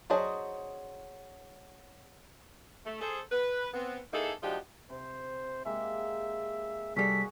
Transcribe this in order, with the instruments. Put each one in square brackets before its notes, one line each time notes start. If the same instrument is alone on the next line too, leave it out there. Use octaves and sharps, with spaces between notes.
[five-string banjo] F#3 D4 G#4 C5 D#5
[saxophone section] A3
G#4 A4 C5
B4
B3 C4
A#3 D#4 E4 G#4 A4
F3 G#3 D4 D#4 F#4 G4
[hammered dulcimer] C3 [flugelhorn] C5
[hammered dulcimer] G#3 A#3 G4 [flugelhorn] E5
[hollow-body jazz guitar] C2 G3 [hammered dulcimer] F#4 G#4 F5 [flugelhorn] A4 [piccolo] B6